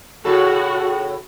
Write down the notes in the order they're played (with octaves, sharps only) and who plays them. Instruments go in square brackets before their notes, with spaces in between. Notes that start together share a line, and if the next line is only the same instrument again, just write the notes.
[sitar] A2 C#3 A4 [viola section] F#4